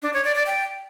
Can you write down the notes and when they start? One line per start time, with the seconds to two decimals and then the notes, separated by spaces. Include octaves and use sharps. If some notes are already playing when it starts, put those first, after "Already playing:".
0.03 D4
0.14 C#5
0.24 D5
0.35 D5
0.46 G5